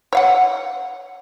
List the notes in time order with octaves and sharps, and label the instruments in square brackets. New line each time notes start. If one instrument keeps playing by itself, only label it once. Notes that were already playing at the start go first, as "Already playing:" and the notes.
[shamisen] C#5 F5 F#5